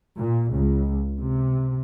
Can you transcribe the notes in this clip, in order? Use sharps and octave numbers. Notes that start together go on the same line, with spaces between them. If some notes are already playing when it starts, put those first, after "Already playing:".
A#2
C#2
C3